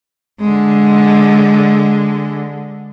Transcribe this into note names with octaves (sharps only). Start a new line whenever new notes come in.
D3 G#3